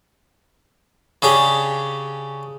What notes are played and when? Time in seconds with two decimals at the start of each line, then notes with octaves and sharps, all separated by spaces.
1.22 C#3 C#4 D4 G4